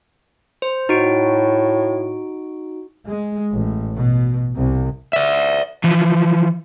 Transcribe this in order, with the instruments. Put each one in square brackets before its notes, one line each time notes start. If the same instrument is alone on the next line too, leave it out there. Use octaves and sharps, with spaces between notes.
[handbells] C5
[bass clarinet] A2 [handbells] D#4 F#4 D7
[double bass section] G#3
A1
B2
C2
[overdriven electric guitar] D5 E5
E3 F3